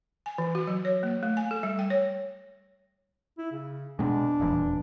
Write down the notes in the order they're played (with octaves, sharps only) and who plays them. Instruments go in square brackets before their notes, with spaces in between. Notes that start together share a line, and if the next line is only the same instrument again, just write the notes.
[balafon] G#5
E3
F#4
F#3
C#5
A#3
A3
G#5
A4
G3
G5
C#5
[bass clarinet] E4
C#3
[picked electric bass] B2 G#3 [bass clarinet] D4
[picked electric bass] D#1 E2